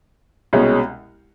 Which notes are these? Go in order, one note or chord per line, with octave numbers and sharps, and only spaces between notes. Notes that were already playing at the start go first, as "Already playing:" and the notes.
C2 B2 G#3 C#4